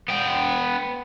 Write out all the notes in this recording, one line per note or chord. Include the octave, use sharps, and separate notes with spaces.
B3 G5